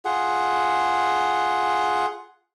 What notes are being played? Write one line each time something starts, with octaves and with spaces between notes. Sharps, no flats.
F4 G#4 F#5